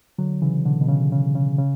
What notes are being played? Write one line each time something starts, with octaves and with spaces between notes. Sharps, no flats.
D3 F#3
C#3 E3
B2 D3
B2
C#3
C#3
C#3
C#3